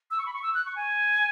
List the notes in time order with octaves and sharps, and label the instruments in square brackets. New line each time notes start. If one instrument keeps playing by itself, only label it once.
[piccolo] E6
C#6
B5
C#6
E6
F#6
C#6
G#5